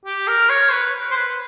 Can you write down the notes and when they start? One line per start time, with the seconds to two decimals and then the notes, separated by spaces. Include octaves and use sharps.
0.06 G4
0.28 A#4
0.49 C#5
0.72 B4
1.11 C5
1.16 B4